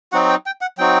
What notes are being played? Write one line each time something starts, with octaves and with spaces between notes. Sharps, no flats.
F#3 C4 D#4 F#4 F#5
G5
G5
F#5
F#3 C4 D#4 F#4 G5